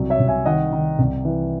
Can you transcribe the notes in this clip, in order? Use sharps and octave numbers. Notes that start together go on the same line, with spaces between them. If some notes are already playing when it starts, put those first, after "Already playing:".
Already playing: C2 F#3
C#5 E5
C2
E5 G#5
D#3 D#5 F#5
D#3
C2
E3